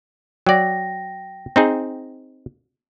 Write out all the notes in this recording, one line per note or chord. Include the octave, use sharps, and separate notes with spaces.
F#3 D5 G5 A#6
C4 D#4 G#4